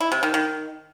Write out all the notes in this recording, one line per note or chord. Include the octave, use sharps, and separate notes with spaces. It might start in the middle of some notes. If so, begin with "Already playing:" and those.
E4
C3
D#3
D#3